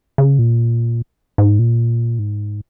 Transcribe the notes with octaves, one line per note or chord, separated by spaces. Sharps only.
C#3
A#2
G#2
A#2
G#2